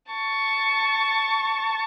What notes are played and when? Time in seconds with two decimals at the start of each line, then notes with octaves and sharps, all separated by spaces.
0.12 A5 C#6